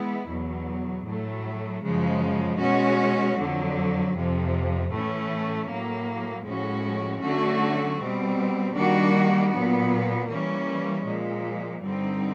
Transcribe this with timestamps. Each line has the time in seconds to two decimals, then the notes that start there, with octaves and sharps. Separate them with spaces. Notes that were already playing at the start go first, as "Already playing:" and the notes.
Already playing: E3 G#3 B3 E4
0.28 E2 B2 F#3
1.06 A2 F#3 A3
1.83 F#2 C#3 F3 G#3
2.59 B2 G#3 C#4 F#4
3.37 F2 D3 F#3
4.13 F2 C3 F3
4.90 A2 E3 A3 C#4
5.67 A2 F#3 A#3
6.44 A2 F3 G#3 C#4 F#4
7.21 D3 F#3 A3 C#4 F#4
7.98 B2 G3 C4
8.75 D#3 G3 A#3 D4 F#4
9.52 A#2 F#3 B3
10.29 E3 G3 A#3 C#4
11.06 A#2 F3 G#3
11.83 G2 D3 G3 C4 D#4